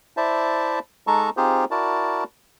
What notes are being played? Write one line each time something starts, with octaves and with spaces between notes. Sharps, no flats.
E4 C5 D5 E5 A5
G#3 D#4 A4 A5 A#5 C#6
C4 D#4 F4 G4 G#4 C5
E4 F#4 A#4 D5 A5